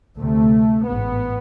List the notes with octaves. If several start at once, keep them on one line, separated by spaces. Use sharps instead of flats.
D2 C3 A3
A1 G#2 B3